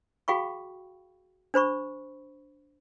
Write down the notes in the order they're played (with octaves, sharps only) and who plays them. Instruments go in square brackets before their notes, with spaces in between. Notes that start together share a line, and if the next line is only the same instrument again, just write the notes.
[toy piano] F#4 G#4 F5 G5 B5 C#6
D4 C5 B5 C#6